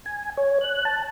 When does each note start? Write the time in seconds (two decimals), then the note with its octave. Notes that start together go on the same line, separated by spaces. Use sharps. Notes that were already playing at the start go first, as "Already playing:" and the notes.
0.06 G#5
0.38 C#5
0.61 F#6
0.85 A5